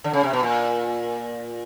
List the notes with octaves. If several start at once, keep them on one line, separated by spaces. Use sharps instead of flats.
D3
C#3
C3
B2
A#2